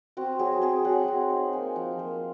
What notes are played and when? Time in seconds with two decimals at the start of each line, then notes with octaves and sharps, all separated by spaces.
0.17 C4 F#4
0.39 F#3 G#4
0.62 C4 G#4
0.85 F#3 F#5
1.08 C4
1.30 D#4
1.53 A#3 G#5
1.76 F3
1.99 A#3